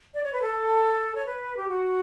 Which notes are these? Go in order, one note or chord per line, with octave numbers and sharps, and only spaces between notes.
D5
C#5
B4
A4
C#5
B4
G4
F#4